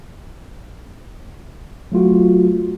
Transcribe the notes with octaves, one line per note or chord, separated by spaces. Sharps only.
F#3 A3 F4 F#4